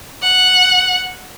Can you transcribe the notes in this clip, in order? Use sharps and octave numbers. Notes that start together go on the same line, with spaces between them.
F#5